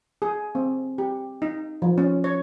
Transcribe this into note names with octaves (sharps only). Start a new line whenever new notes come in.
G#4
C4
G4
D#4
F3
C#4
C#5